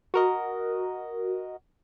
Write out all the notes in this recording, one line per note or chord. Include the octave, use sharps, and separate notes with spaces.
F#4 A#4 D#5